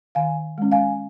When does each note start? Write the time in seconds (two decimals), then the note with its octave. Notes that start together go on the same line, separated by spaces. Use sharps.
0.15 D#3 F5 G#5
0.58 G#3 C#4
0.71 F5 G#5